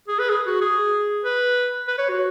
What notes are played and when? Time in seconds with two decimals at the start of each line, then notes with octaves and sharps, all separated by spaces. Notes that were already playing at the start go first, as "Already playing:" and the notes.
0.08 G#4
0.19 B4
0.29 G#4
0.46 F#4
0.62 G#4
1.24 B4
1.88 B4
1.98 C#5
2.09 F#4